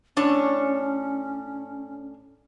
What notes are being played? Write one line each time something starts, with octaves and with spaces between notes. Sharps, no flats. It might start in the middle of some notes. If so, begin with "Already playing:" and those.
A2 C#4 D4 C#5